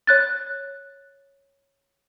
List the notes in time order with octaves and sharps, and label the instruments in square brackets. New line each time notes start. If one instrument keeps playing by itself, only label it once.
[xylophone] C#5 F#6 A6